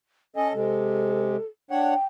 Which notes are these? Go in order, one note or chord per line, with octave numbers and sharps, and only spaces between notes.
C#4 A4 D#5 G#5
C3 G#3 A4
D4 C#5 F#5 G5